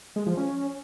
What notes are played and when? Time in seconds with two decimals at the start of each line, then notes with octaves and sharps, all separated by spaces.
0.16 G#3
0.27 F3
0.37 C#4